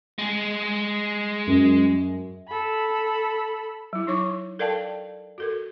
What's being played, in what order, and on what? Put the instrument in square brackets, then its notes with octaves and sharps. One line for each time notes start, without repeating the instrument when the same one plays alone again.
[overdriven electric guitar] G#3 G#4
[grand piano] F#2
[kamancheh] A4 B5
[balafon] F#3 E4
D#4 C#5 C#6 D6
A4 A#4 D5 F5 G5 A5
F#4 A4 A#4